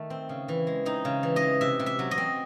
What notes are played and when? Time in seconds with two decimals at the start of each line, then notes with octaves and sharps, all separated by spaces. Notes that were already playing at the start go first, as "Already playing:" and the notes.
Already playing: D#3 A3
0.10 C4
0.29 C#3
0.49 E3
0.67 G#3
0.85 C4 D#4
1.05 C#3
1.23 E3
1.36 D#5
1.42 G#3
1.61 C3 E5
1.80 C3
1.86 E5
1.99 F#3
2.11 D#5
2.18 C4